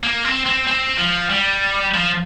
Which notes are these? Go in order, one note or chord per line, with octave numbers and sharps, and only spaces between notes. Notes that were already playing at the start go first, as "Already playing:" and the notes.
A#3
C4
C4
C4
F3
G3
F3